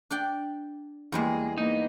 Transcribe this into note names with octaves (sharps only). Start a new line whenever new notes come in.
D4 D5 G5
E2 G3 G#3 A#3 G#4
A#3 B3 D#4